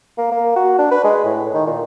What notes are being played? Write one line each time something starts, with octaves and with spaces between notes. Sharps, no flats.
A#3
A#3
F#4
D4
B4
G#3
A2
D#3
A#2